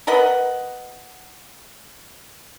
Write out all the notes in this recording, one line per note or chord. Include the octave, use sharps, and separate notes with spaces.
A#4 B4 D#5 F#5